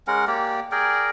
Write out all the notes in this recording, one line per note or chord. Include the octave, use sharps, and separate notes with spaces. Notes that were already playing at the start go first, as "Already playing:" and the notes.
G#3 C#4 A#4 F#5
A#3 G4 D5
G#4 A#4 D5 G5